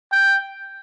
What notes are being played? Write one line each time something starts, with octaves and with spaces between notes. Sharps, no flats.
G5